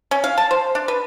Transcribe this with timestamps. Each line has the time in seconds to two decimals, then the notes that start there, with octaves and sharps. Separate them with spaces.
0.11 C#4
0.24 F5
0.38 A5
0.51 C5
0.75 D4
0.88 B4